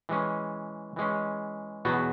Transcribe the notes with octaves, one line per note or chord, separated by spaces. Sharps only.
E3 G#3 C#4
E3 G#3 C#4
E2 B2 F#3 B3 F#4